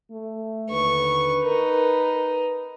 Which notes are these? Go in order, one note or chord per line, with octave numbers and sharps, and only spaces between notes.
A3
D#2 D3 B4 C#6
D#4 A#4